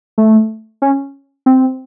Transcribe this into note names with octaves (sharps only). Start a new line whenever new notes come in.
A3
C#4
C4